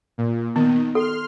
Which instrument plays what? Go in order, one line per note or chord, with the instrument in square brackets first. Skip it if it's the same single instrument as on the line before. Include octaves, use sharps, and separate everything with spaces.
[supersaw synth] A#2
[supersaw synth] D#3 [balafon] B3
[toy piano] A4 [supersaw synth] C6 F6